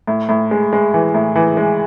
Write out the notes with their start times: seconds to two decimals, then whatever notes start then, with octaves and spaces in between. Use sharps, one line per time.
0.07 A2
0.29 A2
0.51 G#3
0.73 G#3
0.94 E3
1.14 A2
1.36 E3
1.57 G#3